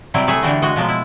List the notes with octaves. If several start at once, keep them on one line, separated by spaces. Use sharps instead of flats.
C3 F#3 G3 E4
A3 G#4 B4 C#5 E5 G#5
D3 E3 G3 F#4
G#3 F#4 D#5
B2 F3 F#3 G#3
E4